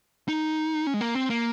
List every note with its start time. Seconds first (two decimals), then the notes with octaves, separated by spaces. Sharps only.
0.28 D#4
0.87 C#4
0.94 G#3
1.01 A#3
1.15 C4
1.30 A#3